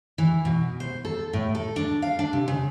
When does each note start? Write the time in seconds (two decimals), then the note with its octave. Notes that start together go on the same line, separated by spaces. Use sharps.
0.18 E3
0.45 B2
0.80 C5
1.05 A4
1.33 A2
1.55 A4
1.76 D4
2.02 F5
2.19 D4
2.33 C3
2.48 C#3